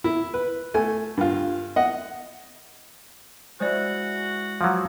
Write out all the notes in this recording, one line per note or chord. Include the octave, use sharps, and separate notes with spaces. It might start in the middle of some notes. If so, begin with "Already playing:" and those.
E4
B4
A3 G#5
G2 F4
D#5 F#5
G#3 E4 F#4 C5 D5
F3 F#3 F5 F#5 D6